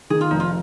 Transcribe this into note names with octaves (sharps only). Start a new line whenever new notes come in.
D#3 G#4
F4
F1 D#4
F4